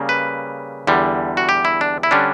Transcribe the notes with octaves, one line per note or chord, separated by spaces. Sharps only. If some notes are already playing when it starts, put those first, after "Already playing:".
Already playing: C#3 G3 A#3
B4
E2 D3 G3
F#4
G4
E4
D4
E4
D3 G3 C#4 D4